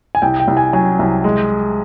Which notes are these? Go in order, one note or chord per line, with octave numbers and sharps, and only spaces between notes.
G#5
C2 G5
G5
C2
G#5
F#3 G#5
C2
G#3